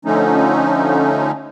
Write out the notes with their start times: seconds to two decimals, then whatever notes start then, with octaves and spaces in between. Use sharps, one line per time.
0.05 D3 F3 A3 C#4 D#4